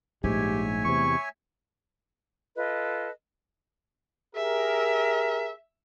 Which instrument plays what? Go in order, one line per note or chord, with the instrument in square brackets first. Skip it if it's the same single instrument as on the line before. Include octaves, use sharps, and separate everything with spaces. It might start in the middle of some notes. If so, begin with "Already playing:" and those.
[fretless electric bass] A#1 G#2 [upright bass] A3 [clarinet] G4 [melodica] C#5 E5 G#5
[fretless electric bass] E2 C3 [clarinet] C#6
[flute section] F4 A4 B4 D#5
[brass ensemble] G4 G#4 A#4 [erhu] E5